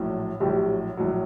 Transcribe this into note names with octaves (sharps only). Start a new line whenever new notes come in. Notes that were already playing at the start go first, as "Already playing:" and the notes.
Already playing: A#1 A2 F#3
A#1 A2 F#3 G4
A#1 A2 F#3